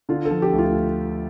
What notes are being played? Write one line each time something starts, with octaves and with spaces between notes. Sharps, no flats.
D3 F4
A4
F3
G4
D2
F4